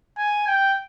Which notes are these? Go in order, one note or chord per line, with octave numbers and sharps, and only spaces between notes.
G#5
G5